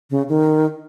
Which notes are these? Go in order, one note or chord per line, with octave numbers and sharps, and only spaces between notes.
C#3
D#3